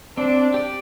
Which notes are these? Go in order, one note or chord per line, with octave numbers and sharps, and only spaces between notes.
C4 D4
G4 D5